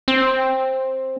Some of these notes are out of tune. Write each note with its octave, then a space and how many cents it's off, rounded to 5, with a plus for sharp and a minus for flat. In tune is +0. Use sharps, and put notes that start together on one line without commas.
C4 +10